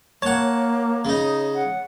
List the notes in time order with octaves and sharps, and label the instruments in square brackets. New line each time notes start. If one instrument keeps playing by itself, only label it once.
[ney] A#3 [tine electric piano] C#5 [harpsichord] F#5 A5
[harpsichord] C#3 D#4
[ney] F#5